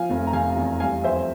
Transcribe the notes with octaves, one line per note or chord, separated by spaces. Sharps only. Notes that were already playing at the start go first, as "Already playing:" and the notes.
Already playing: F3 F5 G#5
F1
A#5
C3 F5 G#5
E2
G3 F5 G#5
F2 C5 E5